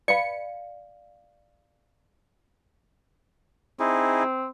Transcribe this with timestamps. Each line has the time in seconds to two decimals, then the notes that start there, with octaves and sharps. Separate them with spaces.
0.08 B4 D5 F5 C#7
3.80 C4 D#4 E4 G#4